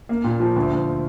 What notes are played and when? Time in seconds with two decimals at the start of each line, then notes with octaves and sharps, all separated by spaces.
0.09 A#3
0.24 A#2
0.40 F3
0.56 D2
0.72 D2